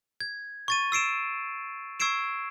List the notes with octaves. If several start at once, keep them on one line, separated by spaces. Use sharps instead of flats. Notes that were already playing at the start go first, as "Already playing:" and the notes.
G#6
C#6 A6 D#7
E6 C7 D7 E7
C#6 E6 G#6 C7 D7 E7